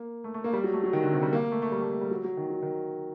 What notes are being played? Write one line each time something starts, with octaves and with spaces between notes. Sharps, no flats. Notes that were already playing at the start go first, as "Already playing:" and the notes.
Already playing: A#3
A3
A3
A#3
G3
F#3
A3
F#3
D#3
D3
C3
G3
A#3
A3
A3
G3
A3
A3
G3
F#3
F#3
D#3
F#3
D#3